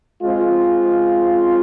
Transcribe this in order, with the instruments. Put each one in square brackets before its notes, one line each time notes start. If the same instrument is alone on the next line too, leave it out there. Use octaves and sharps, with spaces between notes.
[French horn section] G#3 C4 F4